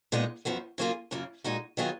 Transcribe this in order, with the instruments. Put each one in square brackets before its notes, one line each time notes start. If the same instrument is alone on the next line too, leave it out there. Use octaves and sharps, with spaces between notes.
[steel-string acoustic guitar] A#2 G#3 B3 D#4
F#2 F3 B3 F#4
C#3 F#3 A#3 F4 G#4
F#2 C#3 F#3 A#3 F4
A#2 G#3 D#4 F#4
D#3 F#3 B3 F4 G#4